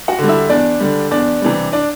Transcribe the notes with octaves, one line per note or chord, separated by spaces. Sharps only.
F#4 F#5
D3 G3
E4 E5
E2 D4 D5
D3 G3
E2 D4 D5
C3 E3 G3
D4 D5